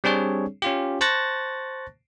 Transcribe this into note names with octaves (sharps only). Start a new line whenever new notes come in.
G3 C4 D4 G#4 C#5
C#4 F4 G4
C5 A5 C#6 F#6 A6 A#6